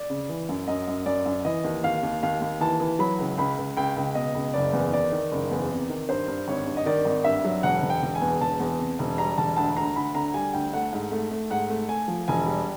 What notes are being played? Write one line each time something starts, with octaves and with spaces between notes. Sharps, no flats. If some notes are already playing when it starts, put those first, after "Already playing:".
Already playing: D5
C#3
E3
F#2
F#2 D#5
F#2
F#2 D5
F#2
E3 D#5
D#2
D#2 F5
D#2
D#2 F5
D#2
E3 A5
E3
F#3 B5
C#2
C#2 B5
C#2
C#2 G5
C#2
B2 D#5
C#2
F#1 D5
E2
D#3 D5
D#3
F#1
E2
C3
D#3
G2 C5
G2
G#1 C#5
G2
D#5
D#3 D5
G#1
G2 E5
F#3
E1 F#5
E1
G5
E1
G#5
E2
E1 A5
E2
C3
E1
G3 A#5
E1 A5
D2 A5
D2 A#5
D2 B5
D3 A#5
G3 G#5
D2 G5
A3 F#5
G#2
A3
A3
G#2 F#5
A3
A3 G#5
F3
E1 G#5
G3